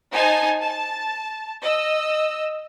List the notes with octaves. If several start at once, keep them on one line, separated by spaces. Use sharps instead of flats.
D#4 C5 G#5 A5
A5
D#5 E6